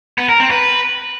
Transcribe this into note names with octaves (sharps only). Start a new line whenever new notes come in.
B3
A#4
C4
B4